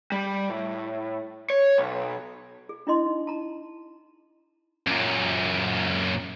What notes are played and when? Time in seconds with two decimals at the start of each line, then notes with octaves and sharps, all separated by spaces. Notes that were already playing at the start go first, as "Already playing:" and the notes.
0.12 G3
0.50 A2
1.50 C#5
1.78 B1
2.69 G#4
2.87 D4 E4 D#5 C6
3.06 D#4
3.27 A5 A#5
4.87 F#2 A#2